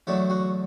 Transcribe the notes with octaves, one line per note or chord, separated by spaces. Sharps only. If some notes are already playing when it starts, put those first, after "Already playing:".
E2 D3 F#3 A3 E4
F#4